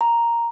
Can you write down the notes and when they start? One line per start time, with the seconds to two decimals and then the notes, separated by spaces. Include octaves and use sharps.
0.01 A#5